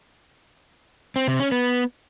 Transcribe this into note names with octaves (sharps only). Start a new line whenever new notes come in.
C4
C3
C#4
B3